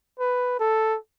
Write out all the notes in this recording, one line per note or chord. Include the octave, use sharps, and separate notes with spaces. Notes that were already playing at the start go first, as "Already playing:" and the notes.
B4
A4